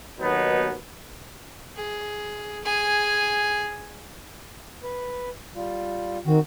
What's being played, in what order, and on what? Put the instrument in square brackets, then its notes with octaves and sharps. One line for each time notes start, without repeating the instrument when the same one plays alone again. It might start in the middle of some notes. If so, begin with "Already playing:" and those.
[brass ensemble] D#2 B2 F#3 B3 D#4
[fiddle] G#4
G#4 G#5
[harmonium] B4
G3 F4
[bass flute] D#3 [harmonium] C4 F#4